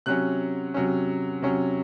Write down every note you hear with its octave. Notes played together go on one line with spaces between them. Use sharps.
C3 F#3 C#4 F#6
C3 F#3 C#4
C3 F#3 C#4